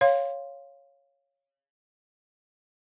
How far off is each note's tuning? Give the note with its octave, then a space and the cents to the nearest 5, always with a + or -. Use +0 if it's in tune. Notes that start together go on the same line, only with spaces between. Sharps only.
C#5 +0 F5 +0 C6 +0